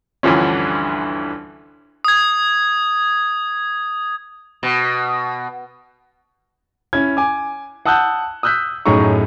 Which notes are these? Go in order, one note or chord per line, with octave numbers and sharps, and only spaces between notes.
D2 G2 D3 E3 F3 C#4
D#6 G#6
B2
C#4 E4 G#6
G#5 D6
F#5 A5 D#6 E6 F#6 G6
D#6 E6 F#6 G6 B6
F#2 A2 D#4 G#4 A#5 C#6